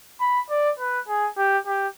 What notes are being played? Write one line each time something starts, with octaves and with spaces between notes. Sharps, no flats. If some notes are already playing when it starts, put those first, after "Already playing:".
B5
D5
B4
G#4
G4
G4